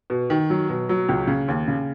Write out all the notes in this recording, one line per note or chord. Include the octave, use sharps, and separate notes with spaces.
B2
D#3
F#3
B2
F#3
C#2
C#3
D#2
C#3